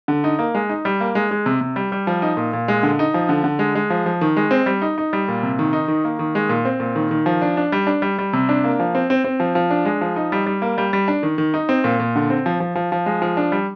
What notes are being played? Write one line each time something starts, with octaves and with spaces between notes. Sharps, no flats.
D3
D#4
A#3
G#3
D#4
G3
A#3
G#3
G#3
C3
C3
G3
G3
F3
D#4
A#2
A#2
G#3
D3
D#4
F3
D3
D3
G#3
G#3
F3
F3
D#3
G#3
C4
G3
D#4
D#4
G3
A#2
C3
D#3
D#4
D#3
A#3
D#3
G#3
A#2
C4
A#2
D#3
D#3
F3
D4
D4
G3
D4
G3
G3
C3
D4
A#3
F3
C4
C4
C4
F3
F3
D4
G#3
F3
D#4
G3
G3
A#3
G3
G3
D4
D#3
D#3
D#4
C4
A#2
A#2
D3
C4
F3
F3
F3
F3
G#3
F3
D4
G3